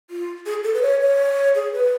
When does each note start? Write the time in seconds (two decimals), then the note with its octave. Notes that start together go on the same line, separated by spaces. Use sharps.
0.10 F4
0.46 G#4
0.64 A4
0.74 B4
0.82 C#5
1.00 C#5
1.55 G#4
1.73 B4